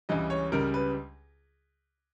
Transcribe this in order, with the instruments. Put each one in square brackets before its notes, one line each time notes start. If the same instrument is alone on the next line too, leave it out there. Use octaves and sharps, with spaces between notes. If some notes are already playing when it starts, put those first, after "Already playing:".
[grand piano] C#2 C#3 E3 G3 D#5
C#5
C#2 C#3 G3 A#4
B4